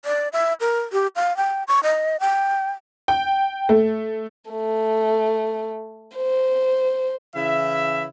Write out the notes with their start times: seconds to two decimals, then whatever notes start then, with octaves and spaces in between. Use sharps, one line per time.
0.05 D5
0.33 E5
0.60 A#4
0.93 G4
1.16 F5
1.37 G5
1.68 C#6
1.83 D#5
2.20 G5
3.08 G5
3.69 A3
4.51 A3
6.17 C5
7.36 C#3 E3 E4 E5